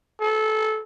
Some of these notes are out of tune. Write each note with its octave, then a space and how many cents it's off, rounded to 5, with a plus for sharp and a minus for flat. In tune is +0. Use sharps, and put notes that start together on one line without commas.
A4 -20